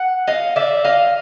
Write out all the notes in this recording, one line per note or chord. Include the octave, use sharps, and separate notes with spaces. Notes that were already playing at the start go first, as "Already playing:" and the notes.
Already playing: F#5
D#5 F5
D5 E5
D#5 F5